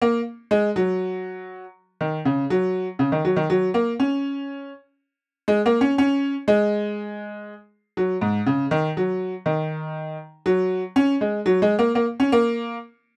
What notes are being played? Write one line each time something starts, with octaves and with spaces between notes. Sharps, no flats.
A#3
G#3
F#3
D#3
C#3
F#3
C#3
D#3
F#3
D#3
F#3
A#3
C#4
G#3
A#3
C#4
C#4
G#3
F#3
G#2
C#3
D#3
F#3
D#3
F#3
C#4
G#3
F#3
G#3
A#3
A#3
C#4
A#3